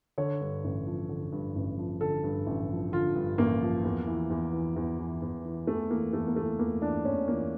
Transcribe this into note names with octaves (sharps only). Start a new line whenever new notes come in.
D3 C#5
G2
A1
F3
D3
G2
A1
F3
D3 A4
G2
A1
F3
D3 F4
G2
A1 A#3
F3
E2
E3
E2
E3
E2
E3
E2
E3
E2 A3
E3 A#3
E2 A3
A#3
E3 A3
E2 A#3
E3 D4
E2 C#4
E3 A#3